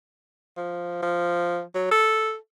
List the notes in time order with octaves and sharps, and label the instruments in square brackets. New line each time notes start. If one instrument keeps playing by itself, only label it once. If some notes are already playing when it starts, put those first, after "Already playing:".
[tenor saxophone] F3
F3
F#3
A4